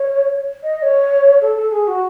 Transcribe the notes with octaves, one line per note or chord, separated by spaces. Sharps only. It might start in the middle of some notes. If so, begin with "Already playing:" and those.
Already playing: C#5
D#5
D#5
C#5
A4
A4
G#4
F#4